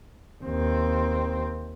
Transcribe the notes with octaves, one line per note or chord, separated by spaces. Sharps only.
D#2 C4